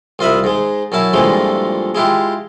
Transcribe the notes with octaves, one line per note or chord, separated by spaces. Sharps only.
C2 F4 D#5 E5 B5
G#2 G#3
F#2 C#4 E4 A5
G2 A#2 E3 F3 G#3 A3
G#3 E4 F4 G4